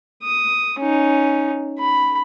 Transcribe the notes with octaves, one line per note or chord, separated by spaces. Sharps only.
D#6
C#4 D#4
B5